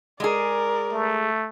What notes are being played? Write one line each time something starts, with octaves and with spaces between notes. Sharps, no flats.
G#3 G#4 A#4 D5
A3